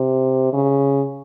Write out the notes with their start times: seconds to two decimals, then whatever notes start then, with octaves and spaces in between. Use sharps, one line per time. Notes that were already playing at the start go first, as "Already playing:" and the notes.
Already playing: C3
0.53 C#3